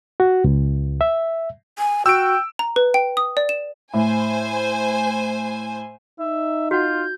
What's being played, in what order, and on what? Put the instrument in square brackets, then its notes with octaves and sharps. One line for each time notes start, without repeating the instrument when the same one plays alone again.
[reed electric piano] F#4
C#2
E5
[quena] G#5
[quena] F#4 [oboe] G5 [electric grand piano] E6 D7
[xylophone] A#5
B4
G5
D#6
D5
E7
[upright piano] A2 [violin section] C5 G#5
[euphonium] D#4 [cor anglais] E5
[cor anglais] F4 [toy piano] F#4 F#5 [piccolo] G6